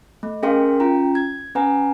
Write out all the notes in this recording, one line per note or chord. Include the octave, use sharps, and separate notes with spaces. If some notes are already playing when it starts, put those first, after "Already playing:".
A3
C#4 G#4 A#4 F5 G5 C6
C#4 F4 G5 A#5
G#6
C#4 B4 F#5 G#5 A#5